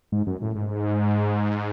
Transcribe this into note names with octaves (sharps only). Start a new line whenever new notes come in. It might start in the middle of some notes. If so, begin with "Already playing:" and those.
G#2
F#2
A2
G#2